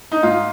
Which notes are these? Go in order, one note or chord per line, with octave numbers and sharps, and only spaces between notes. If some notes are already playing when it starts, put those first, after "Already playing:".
D#4
G#2 F4